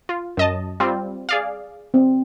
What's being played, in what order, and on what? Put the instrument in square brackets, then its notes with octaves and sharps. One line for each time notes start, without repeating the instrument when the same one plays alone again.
[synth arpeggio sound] F4
F#2 D#5 A5
G3 C4 F4
G#4 D5 F5
[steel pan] C4